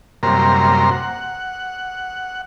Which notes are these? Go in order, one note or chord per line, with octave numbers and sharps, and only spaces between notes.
F#2 C3 G3 A#3 A#4 C6
F#5